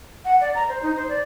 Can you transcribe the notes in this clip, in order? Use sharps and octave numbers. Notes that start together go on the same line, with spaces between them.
F#5
D5
A#5
C5
D#4
C5
D5